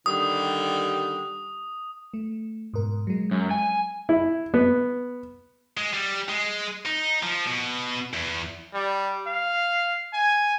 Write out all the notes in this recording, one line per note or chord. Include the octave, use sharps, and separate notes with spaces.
D3 D#3 G3 D#6
A3
G#2 B2 A#4
F#3 G#3
F#2
G#5
E4
B3
G#3
G3
G#3
D#4
F3
B2
E2
G3
F5
G#5